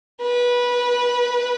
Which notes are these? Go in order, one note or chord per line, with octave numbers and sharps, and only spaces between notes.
B4